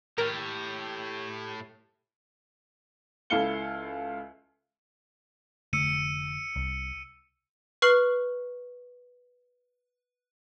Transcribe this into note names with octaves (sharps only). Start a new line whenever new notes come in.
A2 G4 A#4 C#5
C#2 E4 A4 F5 C#7 G7
F1 D3 A3 E6 C#7 D#7
C2
B4 C#6 F6 C7 F#7